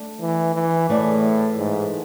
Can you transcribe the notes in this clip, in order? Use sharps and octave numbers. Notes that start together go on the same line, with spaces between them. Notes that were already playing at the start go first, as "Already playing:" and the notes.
Already playing: A3 D4
E3
E3
A2 E3 A3 E4 G#4 D5
G#2